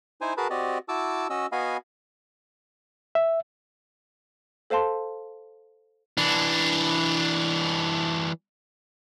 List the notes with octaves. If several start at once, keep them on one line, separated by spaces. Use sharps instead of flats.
D#4 E4 C5 G#5
F#4 G#4 A#4 B4 A5 B5
C4 F#4 G4 D5 D#5
E4 F#4 A5 D6 E6
C#4 F#4 D#5 E6
B3 F#4 D#5 F5 G#5 B5
E5
A4 C5 F5 A5 C6
E3 D4